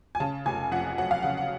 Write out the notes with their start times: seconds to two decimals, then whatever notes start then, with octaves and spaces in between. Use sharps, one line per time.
0.15 G#5
0.20 C#3 A5
0.46 F1 G#5
0.72 F2 F#5
0.98 F#3 F#5
1.11 F5
1.22 C#3 F#5
1.37 F#5